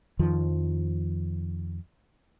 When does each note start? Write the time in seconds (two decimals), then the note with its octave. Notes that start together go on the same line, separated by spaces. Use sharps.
0.19 F2 D#3 F3